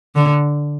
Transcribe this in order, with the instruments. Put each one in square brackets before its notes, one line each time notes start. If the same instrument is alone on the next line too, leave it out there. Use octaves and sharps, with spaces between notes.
[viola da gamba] D3